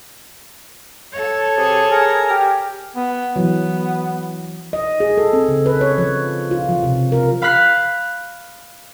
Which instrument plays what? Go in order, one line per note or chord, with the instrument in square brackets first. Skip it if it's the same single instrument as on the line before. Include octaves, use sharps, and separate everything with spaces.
[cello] A4 C#5
[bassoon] C3 [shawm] G#4
[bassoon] G#4 [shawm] A#4
[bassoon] G4
[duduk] B3
[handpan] E3 F#3 [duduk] B3
[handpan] D#5
G#4
A4
C4
C#3
B4
C#5
F3
F4
F3
C3
A#4
[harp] F5 B5 F6 F#6 B6 C7